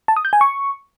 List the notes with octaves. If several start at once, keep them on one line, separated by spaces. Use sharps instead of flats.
A5
D#6
G6
G#5
C#6